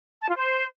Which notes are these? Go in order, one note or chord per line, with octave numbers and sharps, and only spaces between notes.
A5
F4
C5